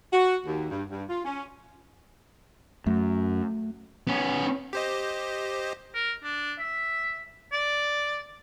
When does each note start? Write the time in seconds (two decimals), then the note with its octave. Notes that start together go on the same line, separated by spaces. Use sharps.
0.13 F#4
0.45 D#2
0.71 G2
0.91 G2
1.10 F4
1.25 C#4
2.86 F#2 A3
4.07 B3 C#4
4.73 G4 C5 D#5
5.94 A#4
6.23 D4
6.59 E5
7.52 D5